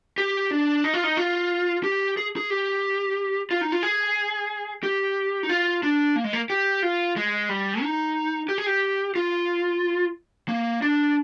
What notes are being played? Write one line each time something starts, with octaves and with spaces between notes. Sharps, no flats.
G4
D4
D#4
F4
D#4
F4
G4
G#4
G#4
G4
F4
D#4
F4
G#4
G4
D#4
F4
D4
A#3
G#3
A#3
G4
F4
G#3
G3
D#4
G4
G#4
G4
F4
A#3
D4